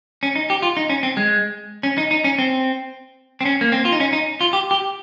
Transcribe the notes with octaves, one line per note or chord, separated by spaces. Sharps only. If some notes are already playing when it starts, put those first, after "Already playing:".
C#4
D#4
G4
F4
D#4
C#4
C4
G#3
C#4
D#4
D#4
C#4
C4
C4
C#4
A#3
C4
F4
D#4
C#4
D#4
F4
G4
G4